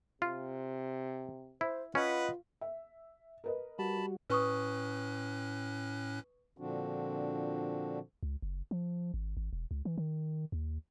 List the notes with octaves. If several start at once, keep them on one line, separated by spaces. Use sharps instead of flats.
C3 F4
E4 C5
C#4 F4 B4 D#5 F#5
E5
A#4 B4 D#5
G3 F#4 A5 B5
A2 C#4 B4 C#6 D#6 F#6
A#2 D3 F3 C4 D4 F#4
C#2
F#1
F3
G#1
G#1
E1
C#2
E3
D#3
D#2